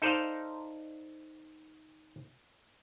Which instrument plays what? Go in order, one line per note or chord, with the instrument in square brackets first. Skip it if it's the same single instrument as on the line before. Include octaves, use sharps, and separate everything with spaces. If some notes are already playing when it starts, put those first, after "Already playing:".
[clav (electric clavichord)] D#4 A4 C5 D5 D#5 F5